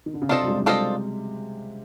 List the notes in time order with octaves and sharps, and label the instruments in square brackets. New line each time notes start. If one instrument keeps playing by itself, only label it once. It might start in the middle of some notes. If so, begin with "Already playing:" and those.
[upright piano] D#3
D3
C#3
[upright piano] C3 [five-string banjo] D4 F4 A4 C5 D#5
[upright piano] F#3
G#3
G3
G#3
[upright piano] G3 [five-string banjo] D4 F4 A4 C5 D#5